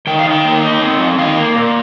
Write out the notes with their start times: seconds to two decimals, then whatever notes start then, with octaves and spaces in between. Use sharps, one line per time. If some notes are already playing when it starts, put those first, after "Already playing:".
0.07 D#3 G5
0.19 F5
0.26 D#3
0.32 G5
0.45 A#3
0.63 D#4
0.82 C4
1.00 F3
1.18 D#3 F5
1.37 A#3
1.55 A#2